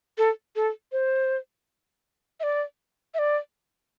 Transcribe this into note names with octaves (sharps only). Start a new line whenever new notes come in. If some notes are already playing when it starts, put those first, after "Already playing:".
A4
A4
C5
E5
D5
E5
D5